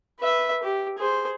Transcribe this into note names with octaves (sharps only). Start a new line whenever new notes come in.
B4 E5
G4
G#4 C5